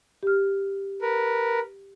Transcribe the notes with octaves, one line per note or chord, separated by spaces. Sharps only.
G4 F6
A#4 B4